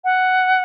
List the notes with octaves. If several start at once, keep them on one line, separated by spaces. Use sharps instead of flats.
F#5